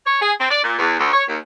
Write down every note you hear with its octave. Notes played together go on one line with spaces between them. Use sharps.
C#5
G#4
C4
D5
A#2
E2
D2
C#5
D#2